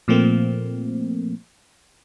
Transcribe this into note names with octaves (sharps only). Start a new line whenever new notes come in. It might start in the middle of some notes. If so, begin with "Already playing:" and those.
A#2 F3 A3 A#3 C4